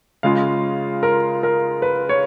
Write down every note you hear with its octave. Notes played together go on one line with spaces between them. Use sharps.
C#3 G#3 C#4 F4 F5
A#4
A#4
B4
C#5